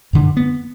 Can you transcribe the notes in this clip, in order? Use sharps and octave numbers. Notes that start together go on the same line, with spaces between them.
F#2 D3
B3